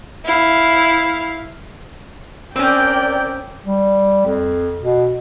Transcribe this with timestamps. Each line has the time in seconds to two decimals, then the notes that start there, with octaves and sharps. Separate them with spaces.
0.25 E4 F5
2.56 C4 C#4 A#4 D5 G5
3.65 G3
4.25 F2
4.80 B2